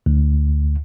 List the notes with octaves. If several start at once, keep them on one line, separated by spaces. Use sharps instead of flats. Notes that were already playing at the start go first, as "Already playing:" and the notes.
D2